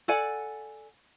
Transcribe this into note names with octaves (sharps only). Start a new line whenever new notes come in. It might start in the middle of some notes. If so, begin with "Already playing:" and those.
A4 D5 F#5 G#5